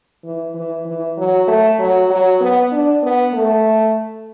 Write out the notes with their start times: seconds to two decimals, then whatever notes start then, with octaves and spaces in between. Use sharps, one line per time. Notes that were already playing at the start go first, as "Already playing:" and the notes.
0.24 E3
0.55 E3
0.86 E3
1.17 F#3
1.48 A3
1.79 F#3
2.10 F#3
2.40 B3
2.72 D4
3.03 B3
3.34 A3